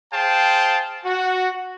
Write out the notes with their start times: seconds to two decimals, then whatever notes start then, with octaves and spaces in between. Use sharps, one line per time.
0.13 G#4 C5 F5 G5 A5
1.05 F#4